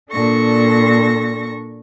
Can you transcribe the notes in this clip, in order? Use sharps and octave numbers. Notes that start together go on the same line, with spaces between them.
A#2 D4 A4 C#6 A#6